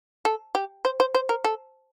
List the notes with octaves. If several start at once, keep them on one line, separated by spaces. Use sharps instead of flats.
A4
G4
C5
C5
C5
A#4
A4